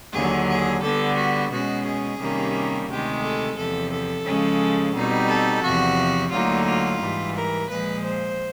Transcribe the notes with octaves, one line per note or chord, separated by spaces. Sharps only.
D#2 D3 F#3 G#4
G#4
D3 G3 B3 A4
F#4
B2 G#3 C#4 F#4
G#4
C3 D#3 G3 A#3 C#4
D2 C3 D#3 G#3 G4
A4
E2 C3 F3 A4
A4
C#3 F3 G#3 C#4
B2 G3 C4 D#4
A4
E2 C3 F3 F#4
D2 D3 F#3 A#3 D#4 F4
F4
G#2 E3 G3
A#4
A#2 F3 G#3 B4
C5